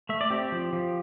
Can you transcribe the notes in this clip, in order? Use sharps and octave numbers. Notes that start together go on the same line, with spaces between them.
A3 E5
D5
C4 G4
F3
F3